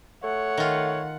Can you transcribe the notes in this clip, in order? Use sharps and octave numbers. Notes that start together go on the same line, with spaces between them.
A3 C#5 F#5
D#3 F4